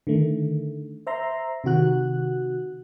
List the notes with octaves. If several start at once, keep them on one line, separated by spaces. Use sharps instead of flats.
D3 D#3 A3
C5 E5 A#5 C6
C3 D#3 F#4 F#6